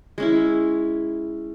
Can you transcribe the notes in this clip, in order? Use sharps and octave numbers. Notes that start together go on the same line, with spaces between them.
G#3 C#4 E4